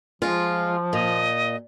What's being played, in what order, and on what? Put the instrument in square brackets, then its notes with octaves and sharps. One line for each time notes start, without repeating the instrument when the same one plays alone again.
[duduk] F3 [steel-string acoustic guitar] G#3 F4
[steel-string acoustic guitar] A#2 [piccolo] D#5